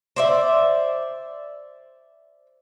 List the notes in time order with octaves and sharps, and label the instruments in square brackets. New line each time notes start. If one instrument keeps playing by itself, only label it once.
[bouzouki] C5 D5 E5